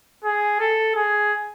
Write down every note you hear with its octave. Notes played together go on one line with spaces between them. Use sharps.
G#4
A4
G#4